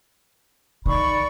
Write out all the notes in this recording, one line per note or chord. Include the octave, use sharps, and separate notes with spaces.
D#3 D5 B5 C#6